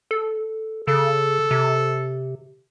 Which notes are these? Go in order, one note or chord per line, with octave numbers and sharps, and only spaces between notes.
A4
C#3 A4
C3